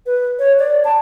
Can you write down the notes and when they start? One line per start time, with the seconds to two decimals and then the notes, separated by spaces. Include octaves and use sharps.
0.06 B4
0.39 C#5
0.59 D5
0.85 A5